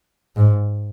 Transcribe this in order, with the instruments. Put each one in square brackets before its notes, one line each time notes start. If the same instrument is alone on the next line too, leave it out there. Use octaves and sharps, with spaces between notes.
[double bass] G#2